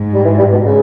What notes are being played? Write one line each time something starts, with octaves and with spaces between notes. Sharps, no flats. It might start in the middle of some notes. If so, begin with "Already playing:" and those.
Already playing: G#2
G3
E3
G3
B2
C#3